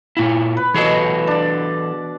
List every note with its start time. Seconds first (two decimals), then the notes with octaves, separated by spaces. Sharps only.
0.17 A#2 E4
0.57 B4
0.74 B2 E3 G#4 A4 C#5
1.27 D4 D5